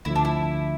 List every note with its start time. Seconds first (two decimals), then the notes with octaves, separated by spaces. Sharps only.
0.05 D2 D3 F3 E4
0.16 D4
0.25 E4